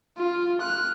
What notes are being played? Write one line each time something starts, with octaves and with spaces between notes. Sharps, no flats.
F4
F6 F#6